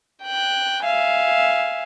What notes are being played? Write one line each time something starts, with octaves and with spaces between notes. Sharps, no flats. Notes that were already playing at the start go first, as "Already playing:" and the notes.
G5 F#6
E5 F5 G#5